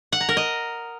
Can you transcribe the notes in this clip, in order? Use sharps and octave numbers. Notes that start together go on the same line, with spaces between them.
F#5
A#5
A#4
D#5